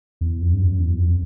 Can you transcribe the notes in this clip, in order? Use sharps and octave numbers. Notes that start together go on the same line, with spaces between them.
E2
F2
G2
F#2
E2
F2